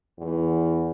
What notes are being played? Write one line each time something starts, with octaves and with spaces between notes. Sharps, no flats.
E2